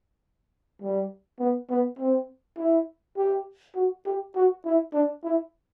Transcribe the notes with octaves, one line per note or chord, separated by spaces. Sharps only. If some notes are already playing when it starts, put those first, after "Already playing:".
G3
B3
B3
C4
E4
G4
F#4
G4
F#4
E4
D4
E4